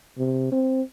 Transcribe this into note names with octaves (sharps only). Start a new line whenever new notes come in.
C3
C4